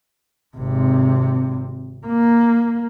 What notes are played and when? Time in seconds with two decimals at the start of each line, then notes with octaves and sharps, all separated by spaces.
0.57 G#1 C3
2.06 A#3